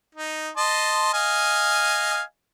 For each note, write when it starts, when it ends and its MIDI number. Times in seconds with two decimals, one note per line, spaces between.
0.15 0.49 63
0.57 1.10 75
0.57 1.10 81
0.57 1.10 84
1.14 2.21 75
1.14 2.21 77
1.14 2.21 80